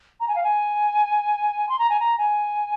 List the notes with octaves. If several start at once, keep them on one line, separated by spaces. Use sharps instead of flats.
A#5
G#5
F5
G#5
C6
A#5
G#5
A#5
G#5